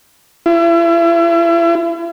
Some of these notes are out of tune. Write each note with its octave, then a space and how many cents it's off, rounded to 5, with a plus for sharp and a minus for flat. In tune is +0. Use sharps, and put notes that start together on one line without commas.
E4 +40